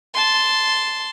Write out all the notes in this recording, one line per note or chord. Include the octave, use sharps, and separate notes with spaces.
A5 C6